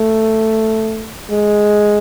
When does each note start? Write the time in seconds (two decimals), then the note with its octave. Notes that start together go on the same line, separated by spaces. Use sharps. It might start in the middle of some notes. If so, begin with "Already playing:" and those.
Already playing: A3
1.30 G#3